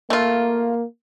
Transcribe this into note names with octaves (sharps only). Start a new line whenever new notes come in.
A3 A#3 F4